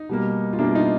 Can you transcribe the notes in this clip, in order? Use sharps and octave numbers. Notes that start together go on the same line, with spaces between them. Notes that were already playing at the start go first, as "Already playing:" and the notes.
Already playing: D#4
B2 G3 A#3
F4
B2 G3 A#3 D4 E4
D#4 F4